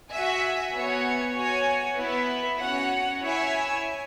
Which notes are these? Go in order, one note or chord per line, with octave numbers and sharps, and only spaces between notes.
F#4 E5 G#5
B3 F#4 C#5 G#5
F#4 C#5 G#5
B3 E4 B4 E5
C#4 F#4 C#5 F#5
E4 C#5 E5 G#5